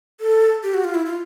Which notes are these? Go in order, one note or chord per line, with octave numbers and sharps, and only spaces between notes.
A4
G4
F#4
F4
E4
F4